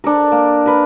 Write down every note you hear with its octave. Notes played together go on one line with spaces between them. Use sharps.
D4 A4 A#4
A#3
A#4 B4